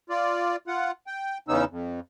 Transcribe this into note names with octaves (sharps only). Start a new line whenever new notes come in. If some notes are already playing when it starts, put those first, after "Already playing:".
F4 D5
F4 F#5
G5
E2 C#3 B3 C#4 D#4 E6
F2